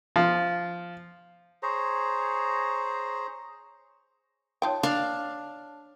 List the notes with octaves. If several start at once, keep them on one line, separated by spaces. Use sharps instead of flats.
F3
G#4 C5 C#5 A#5
D#4 F4 C#5 G5 A5
A#3 D4 F5